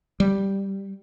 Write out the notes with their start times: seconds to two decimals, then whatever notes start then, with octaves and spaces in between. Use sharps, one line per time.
0.20 G3